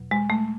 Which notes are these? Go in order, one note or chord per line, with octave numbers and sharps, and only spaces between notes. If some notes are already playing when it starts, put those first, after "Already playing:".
Already playing: E2 B2 F#3
G#3
A3